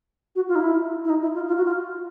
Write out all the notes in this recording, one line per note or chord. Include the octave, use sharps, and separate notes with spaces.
F#4
F4
D#4
E4
E4
D#4
E4
F4
F4
F#4
F4